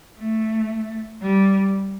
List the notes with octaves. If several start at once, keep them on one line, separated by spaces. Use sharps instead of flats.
A3
G3